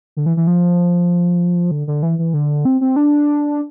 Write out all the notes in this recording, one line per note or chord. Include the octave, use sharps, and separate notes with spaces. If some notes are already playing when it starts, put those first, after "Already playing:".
D3
E3
E3
F3
D3
D3
E3
E3
D3
C4
C4
D4